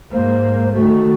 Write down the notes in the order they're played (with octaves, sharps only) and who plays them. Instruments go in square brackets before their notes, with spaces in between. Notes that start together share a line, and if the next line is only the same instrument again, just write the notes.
[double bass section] G#2 A#3 [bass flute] C5
[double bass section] D#3 A3 [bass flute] F#4